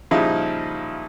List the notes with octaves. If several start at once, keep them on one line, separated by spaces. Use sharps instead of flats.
A#2 C#3 F3 G3 D#4 E4